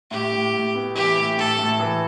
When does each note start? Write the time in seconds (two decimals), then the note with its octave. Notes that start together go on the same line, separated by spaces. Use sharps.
0.11 A2 G4
0.32 A2
0.53 A2
0.75 B3
0.95 E3 G4
1.16 A2
1.37 A2 A4
1.59 A2
1.80 E3